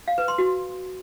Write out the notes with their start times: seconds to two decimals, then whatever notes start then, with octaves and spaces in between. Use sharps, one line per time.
0.08 F5
0.18 B4
0.28 C6
0.38 F#4